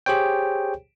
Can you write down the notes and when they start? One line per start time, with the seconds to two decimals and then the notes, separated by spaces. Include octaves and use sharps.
0.06 G4 G#4 C5 C#5 G5